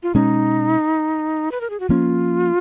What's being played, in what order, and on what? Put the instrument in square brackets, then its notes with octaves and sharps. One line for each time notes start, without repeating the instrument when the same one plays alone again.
[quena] F4
[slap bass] B2 G#3 C#4 [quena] D#4
[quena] B4
A#4
G#4
F#4
[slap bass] F3 A#3 C#4 [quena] F4